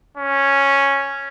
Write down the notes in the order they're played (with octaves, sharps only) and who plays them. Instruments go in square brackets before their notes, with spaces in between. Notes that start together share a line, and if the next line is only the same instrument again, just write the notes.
[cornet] C#4